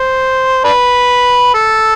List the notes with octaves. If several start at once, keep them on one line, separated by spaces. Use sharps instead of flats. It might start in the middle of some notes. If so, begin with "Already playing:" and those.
Already playing: C5
D4 B4
A4